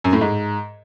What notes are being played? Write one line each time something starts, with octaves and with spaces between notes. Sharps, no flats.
F#2
A2
G#2